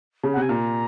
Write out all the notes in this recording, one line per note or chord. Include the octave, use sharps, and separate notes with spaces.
C#3
F#5
C3 G#5
A#2 A#5